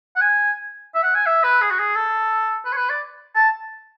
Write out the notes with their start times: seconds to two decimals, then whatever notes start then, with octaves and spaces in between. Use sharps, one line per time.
0.16 F#5
0.21 G#5
0.95 E5
1.03 F#5
1.15 G#5
1.26 E5
1.43 B4
1.61 G#4
1.70 F#4
1.79 G#4
1.96 A4
2.65 B4
2.73 C#5
2.77 B4
2.89 D5
3.35 A5